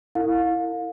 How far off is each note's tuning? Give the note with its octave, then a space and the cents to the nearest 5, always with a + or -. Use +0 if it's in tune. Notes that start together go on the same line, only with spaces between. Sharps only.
E4 +0 A#4 -40 F5 +30